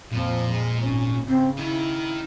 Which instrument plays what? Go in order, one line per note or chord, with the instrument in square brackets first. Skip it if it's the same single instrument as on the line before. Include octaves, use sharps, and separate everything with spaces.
[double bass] F2 F3 [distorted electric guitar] A#2
[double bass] G#3
G#1 C#4
[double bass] C#3 [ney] C4
[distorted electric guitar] D#3 D#4 [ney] E4